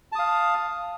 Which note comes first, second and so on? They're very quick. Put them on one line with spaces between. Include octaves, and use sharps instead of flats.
A5 D#6 F5